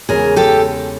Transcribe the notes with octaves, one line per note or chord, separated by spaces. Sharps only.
E2 C#3 E3 G#3 C#4 G#4 A#4
G4 A4